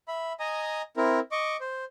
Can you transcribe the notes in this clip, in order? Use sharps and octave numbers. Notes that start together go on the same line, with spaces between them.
E5 B5
D#5 G#5 A#5 D#6
C4 E4 A#4
D#5 C#6 D6
C5